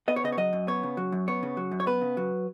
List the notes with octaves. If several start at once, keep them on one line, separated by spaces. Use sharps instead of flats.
B3 D#5
C#5
C#3 D#5
C#5
F#3 D#5
F#2
B3 C#5
C#3
F#3
F#2
B3 C#5
C#3
F#3
F#2
C#5
B3 B4
C#3
F#3